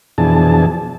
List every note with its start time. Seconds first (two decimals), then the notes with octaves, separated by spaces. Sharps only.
0.18 F2 B2 E3 D4 G#4 A5